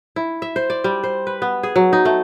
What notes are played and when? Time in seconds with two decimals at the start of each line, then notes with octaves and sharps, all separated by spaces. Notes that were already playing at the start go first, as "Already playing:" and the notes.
0.16 E4
0.42 E5
0.56 C5
0.70 D5
0.84 G3
1.04 C5
1.27 B4
1.42 B3
1.63 G#4
1.76 F#3
1.93 D#4
2.05 A3